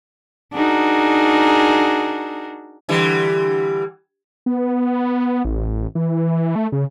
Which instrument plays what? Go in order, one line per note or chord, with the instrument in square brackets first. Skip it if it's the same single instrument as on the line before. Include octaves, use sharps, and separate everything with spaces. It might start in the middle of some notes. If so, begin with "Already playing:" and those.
[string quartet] D4 D#4 F#4 G#4 A#4
[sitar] D3 E3 G3
[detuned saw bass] B3
A1
E3
A3
C#3